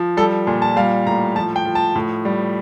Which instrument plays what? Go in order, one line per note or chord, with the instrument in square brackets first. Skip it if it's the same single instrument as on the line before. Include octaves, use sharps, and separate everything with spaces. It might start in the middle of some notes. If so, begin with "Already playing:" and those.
Already playing: [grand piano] F3
G3 A4
A#2
A5
G3 F5
A2 A#5
F3 A5
G5
F3
A5
A2
G3